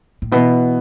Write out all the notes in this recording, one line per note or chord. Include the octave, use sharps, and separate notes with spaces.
A2
B2 E3 B3 E4